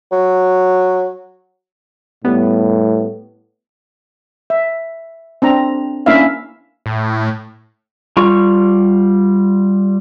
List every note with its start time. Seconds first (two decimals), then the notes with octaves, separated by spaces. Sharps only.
0.12 F#3
2.24 A2 G3 B3
4.50 E5
5.42 C4 D4 A#5
6.06 A#3 C#4 D4 E4 E5 F5
6.86 A2
8.17 G3 F4 C#6